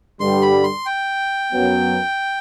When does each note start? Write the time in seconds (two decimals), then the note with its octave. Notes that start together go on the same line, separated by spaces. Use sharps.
0.20 G2 D3 G3 C6
0.42 B5
0.63 C6
0.86 G5
1.52 F#2 F#3 B3